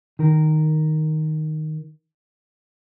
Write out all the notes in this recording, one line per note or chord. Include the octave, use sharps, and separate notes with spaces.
D#3 A#4